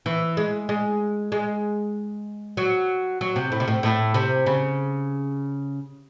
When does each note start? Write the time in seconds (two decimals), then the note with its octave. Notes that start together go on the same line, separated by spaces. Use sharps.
0.06 E3
0.37 G#3
0.69 G#3
1.32 G#3
2.57 F#3
3.21 F#3
3.36 C3
3.52 A2
3.60 C3
3.68 A2
3.83 A2
4.14 C3
4.46 C#3